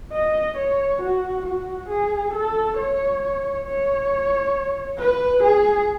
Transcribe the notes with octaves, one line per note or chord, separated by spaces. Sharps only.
D#5
C#5
F#4
F#4
G#4
A4
C#5
C#5
B4
G#4